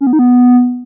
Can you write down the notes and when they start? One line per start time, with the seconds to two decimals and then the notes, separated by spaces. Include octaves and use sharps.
0.01 C#4
0.07 B3
0.13 D#4
0.19 B3